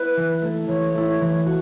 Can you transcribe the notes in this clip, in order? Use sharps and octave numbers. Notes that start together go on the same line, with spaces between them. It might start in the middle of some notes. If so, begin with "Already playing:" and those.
Already playing: B3 E4 B4
E3
A3 E4
E3 C#5
A3 E4
E3
F#4